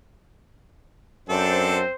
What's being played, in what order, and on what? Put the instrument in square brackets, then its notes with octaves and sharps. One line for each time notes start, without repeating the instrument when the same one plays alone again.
[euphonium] F#2 [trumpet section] C4 C5 [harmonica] D4 A4